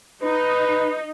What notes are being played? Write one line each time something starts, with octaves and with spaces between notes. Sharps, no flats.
D#4 B4